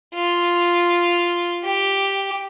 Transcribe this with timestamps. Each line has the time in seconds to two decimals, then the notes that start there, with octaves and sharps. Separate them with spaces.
0.14 F4
1.64 G4